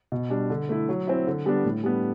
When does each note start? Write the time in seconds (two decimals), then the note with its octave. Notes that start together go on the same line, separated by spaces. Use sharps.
0.12 B2
0.30 G3 D4
0.50 D3
0.69 A3 E4
0.89 F#3
1.07 C4 E4
1.27 D3
1.46 G3 B3 D4
1.65 A2
1.84 G3 B3 D4